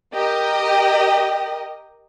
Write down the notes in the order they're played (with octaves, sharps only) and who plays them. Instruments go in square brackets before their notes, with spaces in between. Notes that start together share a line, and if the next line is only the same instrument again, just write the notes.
[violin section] G4 A#4 D#5